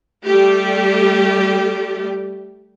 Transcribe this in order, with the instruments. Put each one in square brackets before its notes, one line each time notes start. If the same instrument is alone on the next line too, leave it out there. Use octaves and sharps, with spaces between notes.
[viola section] G3 A3 G4